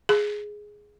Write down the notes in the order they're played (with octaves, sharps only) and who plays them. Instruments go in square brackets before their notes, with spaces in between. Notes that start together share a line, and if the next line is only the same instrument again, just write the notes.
[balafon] G#4